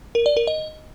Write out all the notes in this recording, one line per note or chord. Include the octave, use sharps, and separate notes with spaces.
A#4
D5
A#4
D#5